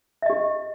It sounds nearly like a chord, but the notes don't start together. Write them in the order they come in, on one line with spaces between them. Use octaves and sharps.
E5 D#5 G4